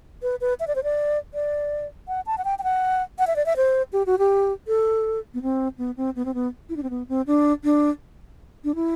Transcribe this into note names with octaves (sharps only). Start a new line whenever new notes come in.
B4
B4
E5
D5
C5
D5
D5
F#5
A5
F#5
G5
G5
F#5
F#5
E5
D5
E5
C5
G4
F#4
G4
A4
B3
C4
B3
C4
B3
C4
B3
E4
D4
C4
B3
C4
D4
D4
D4
E4